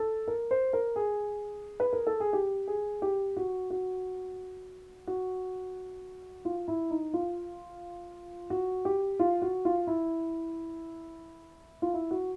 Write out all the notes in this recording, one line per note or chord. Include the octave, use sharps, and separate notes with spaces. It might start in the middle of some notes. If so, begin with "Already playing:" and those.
Already playing: A4
A#4
C5
A#4
G#4
B4
A#4
A4
G#4
G4
G#4
G4
F#4
F#4
F#4
F4
E4
D#4
F4
F#4
G4
F4
F#4
F4
E4
F4
E4
F#4